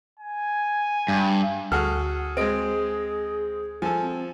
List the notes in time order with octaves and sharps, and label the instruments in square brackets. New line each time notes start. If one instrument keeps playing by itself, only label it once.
[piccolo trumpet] G#5
[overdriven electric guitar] G2
[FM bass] D2 [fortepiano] F#4 G#4 A4 [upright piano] F#5 F6
[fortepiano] G#3 C4 [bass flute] G#4 [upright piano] D#5 D7
[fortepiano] F3 A4 [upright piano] G#5
[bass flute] C4